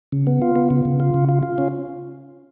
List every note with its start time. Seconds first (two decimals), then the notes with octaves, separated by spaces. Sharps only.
0.12 C#3
0.27 B3
0.42 F4
0.56 B3
0.70 C#3
0.85 C#3
1.00 F4
1.14 C#3
1.29 F4
1.43 F4
1.58 C#4